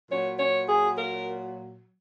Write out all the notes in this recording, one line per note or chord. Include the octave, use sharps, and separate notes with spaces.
A#2 F#3 C#5
C#5
G#4
A#4